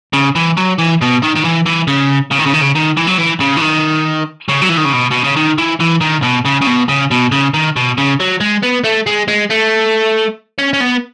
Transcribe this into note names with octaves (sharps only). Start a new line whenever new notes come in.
C#3
E3
F#3
E3
B2
D#3
D#3
E3
E3
C#3
C#3
D#3
C#3
D#3
C#3
D#3
E3
F#3
E3
C#3
E3
D#3
C#3
F#3
E3
D#3
C#3
B2
B2
C#3
D#3
E3
E3
D#3
B2
C#3
C#3
B2
C#3
B2
C#3
D#3
B2
C#3
F#3
G#3
B3
A3
G#3
G#3
A3
C#4
C#4
B3